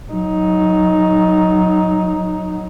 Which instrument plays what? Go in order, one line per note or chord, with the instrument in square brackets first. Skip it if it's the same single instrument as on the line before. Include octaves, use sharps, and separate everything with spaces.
[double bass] F#3 D#4